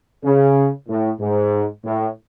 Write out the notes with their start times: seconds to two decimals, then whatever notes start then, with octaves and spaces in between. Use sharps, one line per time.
0.24 C#3
0.88 A2
1.19 G#2
1.84 A2